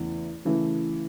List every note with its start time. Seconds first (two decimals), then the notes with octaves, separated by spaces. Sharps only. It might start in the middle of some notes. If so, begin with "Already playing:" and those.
Already playing: E2 C#3 E3 A3
0.45 C#3 E3 A3